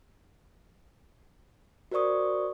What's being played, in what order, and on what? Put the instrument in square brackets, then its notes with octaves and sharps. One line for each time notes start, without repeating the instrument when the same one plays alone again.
[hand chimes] F#4 A#4 C5 D5 C#6 D#6